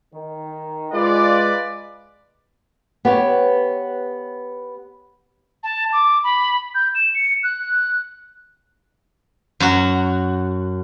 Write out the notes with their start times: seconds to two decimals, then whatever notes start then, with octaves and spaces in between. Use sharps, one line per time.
0.13 D#3
0.92 G#3 F4 B4 D5
3.05 B3 G4 C#5
5.63 A5
5.93 D6
6.24 B5
6.75 G6
6.95 E7
7.15 C#7
7.44 F#6
9.60 F#2 F#4